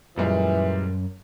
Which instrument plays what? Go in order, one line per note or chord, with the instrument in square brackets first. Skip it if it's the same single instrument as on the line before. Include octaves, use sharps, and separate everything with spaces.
[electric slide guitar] F#2 [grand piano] A#2 G3 G#3 [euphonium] E3